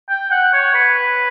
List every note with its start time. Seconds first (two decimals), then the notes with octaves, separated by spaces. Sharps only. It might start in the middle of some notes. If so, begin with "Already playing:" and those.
0.09 G5
0.31 F#5
0.53 C#5
0.74 B4